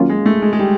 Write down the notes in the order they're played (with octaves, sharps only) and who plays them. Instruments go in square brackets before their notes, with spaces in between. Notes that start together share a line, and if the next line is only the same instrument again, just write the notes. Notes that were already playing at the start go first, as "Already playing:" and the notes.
Already playing: [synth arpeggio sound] D#3 F#3 A#3 C#4 F4
[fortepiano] G#3
A3
G#3
G#3
G3